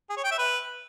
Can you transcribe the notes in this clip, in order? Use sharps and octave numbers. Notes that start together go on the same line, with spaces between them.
G#4
C#5
G5
E5
B4